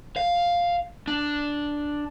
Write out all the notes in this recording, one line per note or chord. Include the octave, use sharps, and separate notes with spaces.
F5
D4